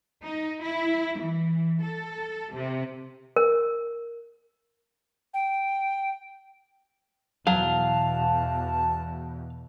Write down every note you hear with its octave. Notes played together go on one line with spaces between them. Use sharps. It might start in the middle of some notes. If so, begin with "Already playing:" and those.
D#4
E4
E3
A4
C3
A#4
G5
E2 B2 F#3 F5 A5